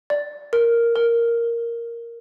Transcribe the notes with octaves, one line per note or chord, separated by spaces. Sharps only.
D5
A#4
A#4